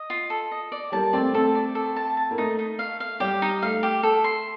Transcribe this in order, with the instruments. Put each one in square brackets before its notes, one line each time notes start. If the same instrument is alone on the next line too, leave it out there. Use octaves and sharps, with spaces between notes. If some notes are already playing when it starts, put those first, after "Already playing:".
Already playing: [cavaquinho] D#5
F4
A4
D#5
D5
[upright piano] G3 A#3 [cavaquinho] A5
[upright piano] A3 C4 [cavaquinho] D5
[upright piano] A3 C4 [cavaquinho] A4
[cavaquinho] D5
A4
A5
A5
[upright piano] A#3
[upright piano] A3 [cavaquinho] D#4
[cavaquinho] D#4
F5
F5
[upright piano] G3 [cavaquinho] G4
[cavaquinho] D#4
[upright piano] A3 [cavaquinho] F5
[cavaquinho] G4
A4
C6